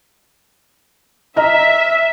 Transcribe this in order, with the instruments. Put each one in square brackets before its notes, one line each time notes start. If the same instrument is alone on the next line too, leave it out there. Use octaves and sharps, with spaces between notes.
[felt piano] D#5 A#5 F6 [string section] E5